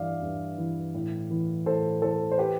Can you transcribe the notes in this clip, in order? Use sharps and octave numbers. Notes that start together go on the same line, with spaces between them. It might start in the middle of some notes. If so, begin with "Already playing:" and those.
Already playing: G2 E3 D5 E5 F5
G2
E3
A2
E3
A2 A4 C5
E3 A4 C5
C5
G4 B4